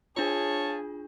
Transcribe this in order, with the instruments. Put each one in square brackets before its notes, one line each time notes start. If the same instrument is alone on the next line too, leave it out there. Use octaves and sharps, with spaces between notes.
[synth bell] D4 F4 [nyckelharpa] G#4 [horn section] C#5 F5 A5